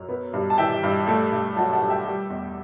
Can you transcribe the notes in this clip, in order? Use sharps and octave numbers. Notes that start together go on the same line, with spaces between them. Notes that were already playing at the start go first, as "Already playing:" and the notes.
Already playing: F#2 C#5
B3
G2
A5
E3 E5 G5
G2
A3
G2
F#3 F#5 A5
F#5 A5
G2
E5 G5
G3
E2